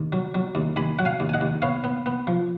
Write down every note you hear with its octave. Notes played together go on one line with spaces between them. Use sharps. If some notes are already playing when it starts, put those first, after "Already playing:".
Already playing: D#2
F#3
F#3
D#2
D#2 G#5 B5
F#3 F#5
F5 G#5
D#2
G#5
D#5 F#5
D#2
B3 C#5 F5
B3
B3
F3